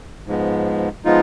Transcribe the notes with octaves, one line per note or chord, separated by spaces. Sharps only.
G#2 F3 G#3 B3
F3 G#3 B3 D#4 F4